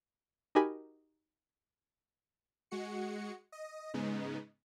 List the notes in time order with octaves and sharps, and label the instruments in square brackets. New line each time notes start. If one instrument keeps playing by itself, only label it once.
[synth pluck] D#4 F#4 G4 A#4 G#5 B5
[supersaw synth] G#3 F#4 C#7
D#5
G#2 C#3 G#3 B3 D#4